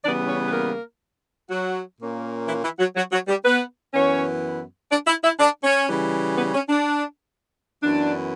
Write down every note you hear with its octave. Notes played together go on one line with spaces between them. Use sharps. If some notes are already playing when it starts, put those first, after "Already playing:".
C#3 E3 G3 B3 D4 D5
C#4 C#5
B4
A#3 A#4
F#3 F#4
A#2 A#3 C#4
E3 E4
E3 E4
F#3 F#4
F#3 F#4
F#3 F#4
G3 G4
B3 B4
F#2 E3 B3 C#4 C#5
D4 D5
E4 E5
E4 E5
D4 D5
C#4 C#5
C#3 E3 G3
B3 B4
C#4
D4
F#2 E3 B3 D4